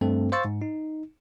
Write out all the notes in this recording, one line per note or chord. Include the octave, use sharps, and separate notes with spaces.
G2 A3 C4 A4
C5 F5 C6 C#6 E6 A6
G#2
D#4